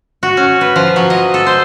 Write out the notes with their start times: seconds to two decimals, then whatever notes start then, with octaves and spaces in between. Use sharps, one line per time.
0.23 F#4
0.37 C#4
0.61 B4
0.76 F3
0.96 F#3
1.10 D#5
1.34 A4
1.47 C5